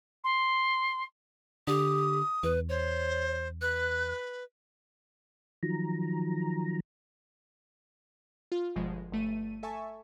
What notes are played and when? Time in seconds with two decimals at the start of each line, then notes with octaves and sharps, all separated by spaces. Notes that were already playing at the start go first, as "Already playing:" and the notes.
0.24 C6
1.67 D3 G4 D#6
2.43 E2 B4
2.69 C5 C#5
3.61 B4 F#6
5.63 D#3 F3 F#3 A#5
8.52 F4
8.76 G1 B2 F3 G#3
9.12 G1 A3 D#7
9.63 A4 E5 G#5 A5 C#6